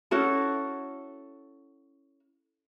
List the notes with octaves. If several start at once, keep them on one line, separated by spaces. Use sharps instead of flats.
C#4 E4 F#4 A4